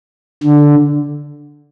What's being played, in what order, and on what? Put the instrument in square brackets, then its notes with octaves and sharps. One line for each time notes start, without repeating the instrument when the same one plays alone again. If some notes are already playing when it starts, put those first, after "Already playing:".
[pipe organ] D3